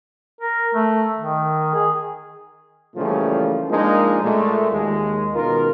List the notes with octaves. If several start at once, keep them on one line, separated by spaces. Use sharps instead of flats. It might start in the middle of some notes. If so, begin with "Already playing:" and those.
A#4
A3
D#3
G#4
A#2 C#3 E3 F3 G3 A3
F3 G#3 A#3 D4 D#4 A#4
A#2 G#3 A3
D#2 G#3
C#2 B2 D#3 F4 A#4